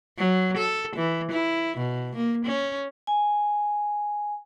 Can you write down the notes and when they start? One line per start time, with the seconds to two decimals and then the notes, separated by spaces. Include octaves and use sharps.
0.18 F#3
0.57 A4
0.96 E3
1.31 E4
1.77 B2
2.16 A#3
2.45 C#4
3.07 G#5